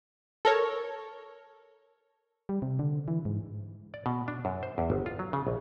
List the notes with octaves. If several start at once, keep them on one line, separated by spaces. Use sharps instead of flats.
A4 A#4 C#5
G3
C3
D3
E3
G#2
D5
B2
D4
F#2
C5
E2
G1
F4
F#3
C#3
A#1